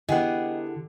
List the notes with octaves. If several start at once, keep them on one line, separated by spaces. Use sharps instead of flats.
D3 B3 E4 G4 G#4 D#5 F#5 G5